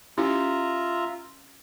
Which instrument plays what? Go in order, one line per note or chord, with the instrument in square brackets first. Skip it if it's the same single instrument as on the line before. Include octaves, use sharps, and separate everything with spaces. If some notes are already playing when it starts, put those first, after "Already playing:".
[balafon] C#4 E4 G4 [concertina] F4 E5 A#5